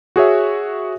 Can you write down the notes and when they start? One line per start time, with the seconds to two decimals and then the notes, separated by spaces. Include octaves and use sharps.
0.16 F#4 G#4 C#5 E5